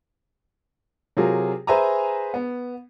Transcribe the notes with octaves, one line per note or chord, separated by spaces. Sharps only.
C3 F#3 F4 G#4 A#4
G#4 B4 C5 E5 G#5 A#5
B3